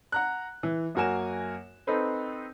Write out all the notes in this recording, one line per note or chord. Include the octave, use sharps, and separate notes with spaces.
F#5 A#5 F#6
E3
F#2 A#3 F#4 A#4 G#5 E7
C4 D#4 A4 B4 C5